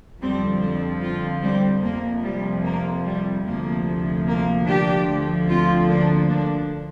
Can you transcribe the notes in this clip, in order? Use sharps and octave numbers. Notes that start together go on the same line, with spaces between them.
F2 D3 F3 G3 C4
G3 C4
C4 F4
G3 C4
F2 C3 F3 A#3
G3
A#3
G3
D2 C3 F3 A#3
A#3
D4 G4
D2 D3 F3
C4 F4
A#3 D4
A#3 D4